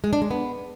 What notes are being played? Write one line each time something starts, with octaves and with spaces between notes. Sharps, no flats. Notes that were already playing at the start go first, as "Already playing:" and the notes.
G#3
D4
G#3
B3